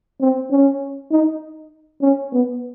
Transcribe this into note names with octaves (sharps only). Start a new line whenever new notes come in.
C4
C#4
D#4
C#4
B3